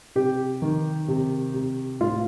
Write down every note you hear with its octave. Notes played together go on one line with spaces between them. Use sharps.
C3 G4
D#3
C3
C3
A2 F4